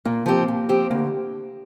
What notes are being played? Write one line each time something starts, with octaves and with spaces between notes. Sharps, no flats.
A#2 A#3
F3 C4 G4
A#2
F3 C4 G4
D2 A#3